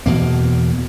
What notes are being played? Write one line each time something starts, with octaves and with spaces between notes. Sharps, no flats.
E2 B2 A#3